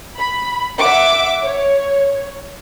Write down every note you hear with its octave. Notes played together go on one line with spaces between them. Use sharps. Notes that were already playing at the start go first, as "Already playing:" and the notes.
B5
E5 F#5 D6
C#5